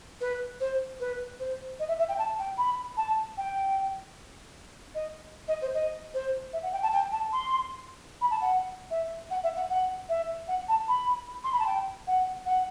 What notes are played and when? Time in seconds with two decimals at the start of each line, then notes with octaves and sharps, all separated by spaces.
0.20 B4
0.60 C5
0.99 B4
1.39 C5
1.79 D#5
1.88 E5
1.98 E5
2.08 G5
2.18 A5
2.38 G5
2.57 B5
2.96 A5
3.37 G5
4.94 D#5
5.47 D#5
5.61 C5
5.74 D#5
6.13 C5
6.52 E5
6.62 F#5
6.72 G5
6.82 A5
6.92 G5
7.11 A5
7.32 C6
8.21 B5
8.30 A5
8.41 F#5
8.90 E5
9.30 F#5
9.43 E5
9.56 F#5
9.69 F#5
10.08 E5
10.47 F#5
10.68 A5
10.88 B5
11.43 C6
11.52 B5
11.59 A5
11.66 G5
12.07 F#5
12.45 F#5